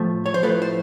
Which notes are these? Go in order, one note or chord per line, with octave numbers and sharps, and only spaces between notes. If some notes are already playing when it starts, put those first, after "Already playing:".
Already playing: A2 F3 A3
C#5
C5
A2 F3 A3 A4 B4
C5